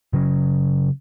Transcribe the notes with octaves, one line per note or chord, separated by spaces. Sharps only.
C#3 F#3 C#4